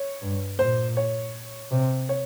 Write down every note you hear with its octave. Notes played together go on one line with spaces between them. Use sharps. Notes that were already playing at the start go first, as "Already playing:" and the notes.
Already playing: C#5
G2
A#2 C5
C#5
C3
C#5